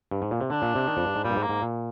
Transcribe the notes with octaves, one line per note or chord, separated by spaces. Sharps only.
G2
G#2
A#2
C3
D3 D4
A#2
C3
D#3
F2
G2
G#2
A#2 G3
G2
G#2
A#3
G#2
A#2